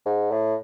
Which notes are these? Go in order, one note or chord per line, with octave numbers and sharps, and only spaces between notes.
G#2
A2